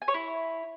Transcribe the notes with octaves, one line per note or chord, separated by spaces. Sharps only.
G#5
C#5
E4